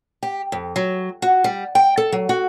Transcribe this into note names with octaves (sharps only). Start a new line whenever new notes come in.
G4
F2
F#3
F#4
G3
G5
A4
F#3
F#4